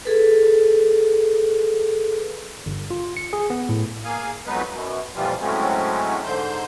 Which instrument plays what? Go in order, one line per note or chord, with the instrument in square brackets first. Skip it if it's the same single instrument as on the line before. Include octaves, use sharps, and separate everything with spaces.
[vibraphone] G#4 A4 B4
[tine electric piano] G1
F4
C#7
G#4
B3
A2
[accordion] A#3 G#4 F5 G#5
F2 F#3 G#3 B3 D#4 B4
F#2 B2
F2 A#2 E3 F3 G3 F4
A2 F#3 G#3 A3 C4 C#4
G#2 D3 C5 G6